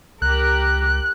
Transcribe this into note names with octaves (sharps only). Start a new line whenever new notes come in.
C#2 G4 A#4 F#6